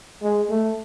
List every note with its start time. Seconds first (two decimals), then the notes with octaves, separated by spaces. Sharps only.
0.22 G#3
0.49 A3